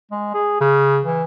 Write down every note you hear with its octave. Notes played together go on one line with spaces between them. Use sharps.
G#3
G#4
C#3
E3